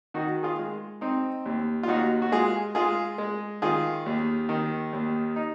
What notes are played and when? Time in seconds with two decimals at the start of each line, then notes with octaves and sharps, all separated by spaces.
0.14 D#3 D#4 F#4
0.43 F4 G#4
0.59 G#3
1.01 C4 D#4
1.46 D#2
1.83 F4
1.88 D#2 D#4 F#4
2.22 F#4
2.32 G#3 F4 G#4
2.75 G#3 F4 G#4
3.18 G#3
3.62 D#3 F4 G#4
4.06 D#2
4.49 D#3
4.93 D#2
5.36 D#4